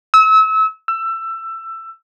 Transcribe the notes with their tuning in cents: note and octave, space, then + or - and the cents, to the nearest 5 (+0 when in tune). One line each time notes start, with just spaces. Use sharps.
E6 -30
E6 +20